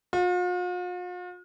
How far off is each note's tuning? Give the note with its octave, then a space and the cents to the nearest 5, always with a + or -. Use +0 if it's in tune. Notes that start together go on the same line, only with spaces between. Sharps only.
F4 +45